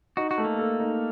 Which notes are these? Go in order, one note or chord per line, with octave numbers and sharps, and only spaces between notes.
D#4 F#4
F#4
A3
A#3
A4
D#4